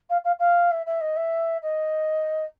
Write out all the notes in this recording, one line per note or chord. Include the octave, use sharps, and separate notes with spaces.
F5
F5
F5
E5
E5
D#5
E5
D#5